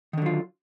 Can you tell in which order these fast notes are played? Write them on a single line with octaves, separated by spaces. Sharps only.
D#3 D3 F#3 F4